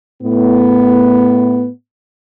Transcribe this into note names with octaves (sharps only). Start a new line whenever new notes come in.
A2 B3